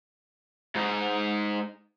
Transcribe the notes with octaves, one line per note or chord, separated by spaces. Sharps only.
G#2 D#4